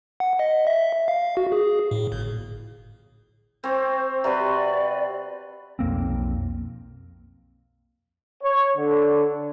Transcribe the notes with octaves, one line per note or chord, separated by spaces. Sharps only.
F#5
D#5
E5
F5
F#4
G#4
A2
G1
C4 C5 C#5
C3 F#4 B4 D5
B1 F2 A#3 C4
C#5
D3